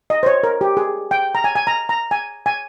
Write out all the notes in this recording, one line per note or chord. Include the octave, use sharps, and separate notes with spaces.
D#5
C5
C#5
A#4
G4
G#4
G5
A#5
G#5
G#5
A#5
A#5
G#5
G#5